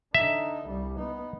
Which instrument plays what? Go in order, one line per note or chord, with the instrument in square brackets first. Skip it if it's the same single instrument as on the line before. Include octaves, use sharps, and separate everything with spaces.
[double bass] D3 D#4 [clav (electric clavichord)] E5
[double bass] C2 G3
B3 D#4